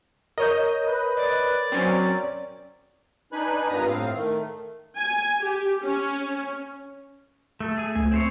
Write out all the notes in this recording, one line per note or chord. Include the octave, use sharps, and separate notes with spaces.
A#4 C#5 D#5 G6
B4
D5
F#3 C4 C#4
D4 D#4 B4 G#5 B5 F#6
G2 A#2 B3 B4 A#5 D#6
A2 C4 F5
D#3 A3
G#5
G4
C#4
A3 A4
A3 G#4 G#5
C#2 A3 G#5
C4 C5 C#5